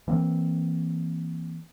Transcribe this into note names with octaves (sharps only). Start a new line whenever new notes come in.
E3 A#3 C4